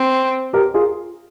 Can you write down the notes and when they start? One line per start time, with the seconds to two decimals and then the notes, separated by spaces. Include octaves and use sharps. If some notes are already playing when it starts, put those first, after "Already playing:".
Already playing: C4
0.53 G4 A#4
0.74 F4 G#4